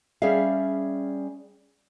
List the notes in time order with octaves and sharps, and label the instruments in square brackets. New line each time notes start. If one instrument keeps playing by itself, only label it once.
[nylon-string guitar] G3 C#4 G#4 D5 E5 F5